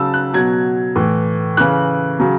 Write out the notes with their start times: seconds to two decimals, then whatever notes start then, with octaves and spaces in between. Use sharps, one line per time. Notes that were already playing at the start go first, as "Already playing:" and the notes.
Already playing: C#3 F#3 A5 E6
0.14 F#6
0.34 B2 F#3 G#6
0.96 A2 E3
1.57 C#3 E3 F#6
2.20 C#3 F#3